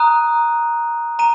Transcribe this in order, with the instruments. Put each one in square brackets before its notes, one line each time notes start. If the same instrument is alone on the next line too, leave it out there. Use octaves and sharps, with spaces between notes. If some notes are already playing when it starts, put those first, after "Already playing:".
Already playing: [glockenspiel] A#5 D#6 F#6 D#7
A#5 D#7